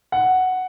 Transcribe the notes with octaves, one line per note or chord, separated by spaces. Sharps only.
F#5